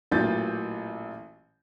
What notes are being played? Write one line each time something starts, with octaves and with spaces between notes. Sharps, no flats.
A1 A#2 E3 F#3 G6 A6